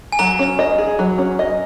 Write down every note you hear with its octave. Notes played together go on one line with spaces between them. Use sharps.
G#5
F#3 A#5
C#4
D#5
G#4
F#3
C#4
D#5